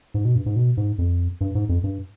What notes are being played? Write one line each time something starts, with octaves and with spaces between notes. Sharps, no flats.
G#2
B2
G2
G#2
B2
G#2
F2
G2
G#2
F2
G2